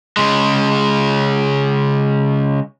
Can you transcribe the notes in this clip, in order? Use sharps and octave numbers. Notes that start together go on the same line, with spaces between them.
C#3 G#3